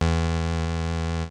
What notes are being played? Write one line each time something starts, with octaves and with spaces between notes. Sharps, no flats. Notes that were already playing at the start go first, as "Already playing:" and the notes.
E2